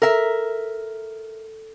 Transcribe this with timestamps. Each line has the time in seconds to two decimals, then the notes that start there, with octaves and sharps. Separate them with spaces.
0.02 A4 A#4 E5